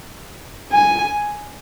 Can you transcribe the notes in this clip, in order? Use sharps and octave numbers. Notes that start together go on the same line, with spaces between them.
G#5